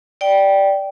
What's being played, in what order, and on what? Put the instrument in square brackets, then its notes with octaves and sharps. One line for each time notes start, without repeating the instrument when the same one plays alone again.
[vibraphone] D5 G5